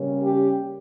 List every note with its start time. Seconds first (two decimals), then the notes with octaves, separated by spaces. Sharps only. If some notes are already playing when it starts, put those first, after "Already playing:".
Already playing: C#3 G3 A#3 C#4
0.23 G4